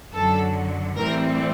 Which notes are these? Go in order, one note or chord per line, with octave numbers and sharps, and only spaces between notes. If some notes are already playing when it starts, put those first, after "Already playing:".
F#2 D3 F#3 A4
A2 E3 G3 C4 A#4